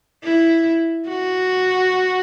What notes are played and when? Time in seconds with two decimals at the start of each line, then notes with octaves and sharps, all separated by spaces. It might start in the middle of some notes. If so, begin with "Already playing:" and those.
0.24 E4
1.08 F#4